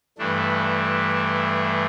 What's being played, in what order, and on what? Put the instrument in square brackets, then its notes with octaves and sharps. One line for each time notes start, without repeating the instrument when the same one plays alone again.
[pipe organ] G2 E3 A3 D4